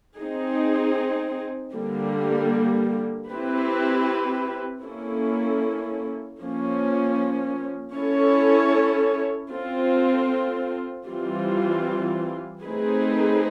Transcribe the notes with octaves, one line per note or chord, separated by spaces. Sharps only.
C4 D#4 G#4
D3 G3 A#3
C4 E4 G4 B4
A#3 C#4 E4 A4
F3 A#3 C#4
C#4 E4 A4 C#5
C4 F4 A4
E3 G3 C4 F4
A3 C4 D#4 G#4 B4